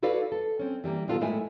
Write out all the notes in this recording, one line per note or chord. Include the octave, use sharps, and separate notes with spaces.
E4 F#4 A4 B4 D5 F5
A4
C4 C#4
E3 G3 A3 A#3
A#2 D#3 B3 F4 F#4 A4
A2 G#3 A3 E4 A#4 G#5